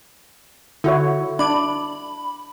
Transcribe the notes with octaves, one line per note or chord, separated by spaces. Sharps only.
D3 E4 F#4 C#5
D4 B5 D6